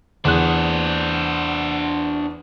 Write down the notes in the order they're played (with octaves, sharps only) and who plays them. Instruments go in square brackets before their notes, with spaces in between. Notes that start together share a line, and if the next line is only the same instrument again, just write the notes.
[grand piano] E2 G#4 F#6 [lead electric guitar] D4 C5